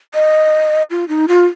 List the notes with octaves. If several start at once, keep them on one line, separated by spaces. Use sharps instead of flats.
D#5
F4
D#4
F4